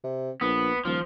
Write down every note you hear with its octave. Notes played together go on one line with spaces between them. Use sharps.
C3
A#1 B3
D#1 F3